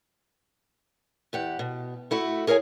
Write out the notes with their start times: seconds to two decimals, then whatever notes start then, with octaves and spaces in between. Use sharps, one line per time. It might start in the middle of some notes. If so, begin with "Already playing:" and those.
1.33 E2 G4 F#5
1.59 B2
2.11 A3 E4 F#4
2.47 G#4 A#4 C#5 E5 G#5